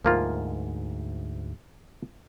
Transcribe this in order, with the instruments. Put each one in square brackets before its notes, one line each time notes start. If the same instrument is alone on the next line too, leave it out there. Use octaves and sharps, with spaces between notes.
[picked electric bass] D2 G#2 [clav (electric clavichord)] F3 A#3 F4